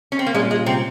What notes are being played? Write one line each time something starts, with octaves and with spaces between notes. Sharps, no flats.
C#4
C4
A#3
A#2 G3 G#3 C#4 F4
G#3
C3 C4